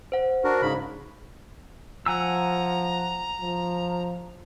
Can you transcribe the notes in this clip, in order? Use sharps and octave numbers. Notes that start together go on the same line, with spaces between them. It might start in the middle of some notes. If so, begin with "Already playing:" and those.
C5 F#5
D4 F#4 A#4
G#2 C#3 B5
F3 F#5 G#5 A#5 E6
F3